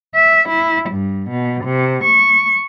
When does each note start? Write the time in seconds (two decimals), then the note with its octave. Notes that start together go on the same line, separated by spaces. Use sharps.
0.16 E5
0.49 E4
0.89 G2
1.31 B2
1.64 C3
2.04 C#6